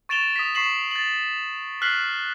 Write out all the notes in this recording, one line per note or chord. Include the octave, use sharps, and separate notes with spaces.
C#6 A6 D7 E7 F7 G7
D#6 B6
C#6 B6 C7 E7 F#7
A6 F#7
F6 F#6 B6 C7 F#7